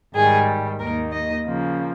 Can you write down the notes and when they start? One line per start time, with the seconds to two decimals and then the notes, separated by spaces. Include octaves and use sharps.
0.14 G#2 D#3 G3 G#4
0.79 D#2 D#3 A#3 D#4 A#4
1.13 D#5
1.45 C#3 F3 A#3